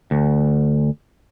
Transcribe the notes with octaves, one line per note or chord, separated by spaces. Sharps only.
D2